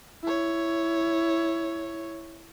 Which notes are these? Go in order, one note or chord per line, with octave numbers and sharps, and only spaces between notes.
E4 C#5